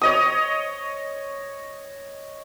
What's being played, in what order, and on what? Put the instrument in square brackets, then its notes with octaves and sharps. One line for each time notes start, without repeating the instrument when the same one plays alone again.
[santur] C#5 D#5 D#6